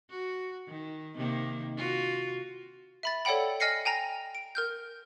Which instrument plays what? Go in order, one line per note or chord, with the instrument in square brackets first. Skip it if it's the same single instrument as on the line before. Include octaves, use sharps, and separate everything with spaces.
[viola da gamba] F#4
D#3
C3 D#3 A#3
F4 F#4
[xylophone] E5 B5 A6
A4 C#5 D5 F#5 G5 B5
D#5 G#5 F6 A#6 C7 C#7
G5 G#5 A#5 A#6
D7
A#4 F6 G6